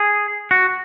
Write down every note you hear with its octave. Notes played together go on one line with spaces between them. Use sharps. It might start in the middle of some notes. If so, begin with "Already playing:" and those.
Already playing: G#4
F#4